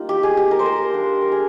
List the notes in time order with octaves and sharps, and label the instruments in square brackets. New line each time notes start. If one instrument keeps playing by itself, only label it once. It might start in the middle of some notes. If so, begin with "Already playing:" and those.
Already playing: [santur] G3 A#3 D#4 F4
G4
G#4
G4
A#4
C5
A#4
G3 A#3 D4
A#4
G#4